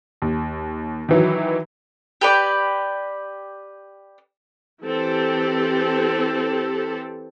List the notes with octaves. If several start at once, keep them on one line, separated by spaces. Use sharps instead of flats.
D#2
D#3 E3 F#3
G4 B4 D5
E3 C4 G4 A4